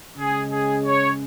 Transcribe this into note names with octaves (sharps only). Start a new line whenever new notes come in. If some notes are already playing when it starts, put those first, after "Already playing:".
C#3 G#3 G#4
G#4
C#5